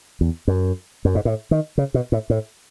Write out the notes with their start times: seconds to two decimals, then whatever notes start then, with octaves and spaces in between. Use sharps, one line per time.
0.21 E2
0.48 F#2
1.05 F#2
1.15 G#2
1.25 A2
1.51 D#3
1.78 C#3
1.94 B2
2.12 A2
2.30 A2